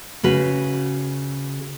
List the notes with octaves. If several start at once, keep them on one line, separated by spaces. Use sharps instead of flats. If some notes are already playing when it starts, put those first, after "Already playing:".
C#3 F#4 B4